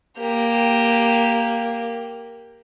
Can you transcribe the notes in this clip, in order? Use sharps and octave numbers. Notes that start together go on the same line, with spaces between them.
A#3 G4